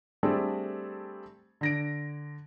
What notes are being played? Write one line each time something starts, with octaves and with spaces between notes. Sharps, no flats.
G3 A3 C4 D4 G#4 A4
D3 A#6 D7